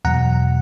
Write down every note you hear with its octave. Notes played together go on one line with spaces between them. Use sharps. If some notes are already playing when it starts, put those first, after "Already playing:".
E2 B2 F#3 F#5 A#5